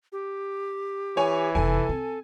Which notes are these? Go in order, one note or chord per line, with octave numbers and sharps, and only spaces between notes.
G4
E3 C#5 G#5
F1 E2 A4 G#5
C4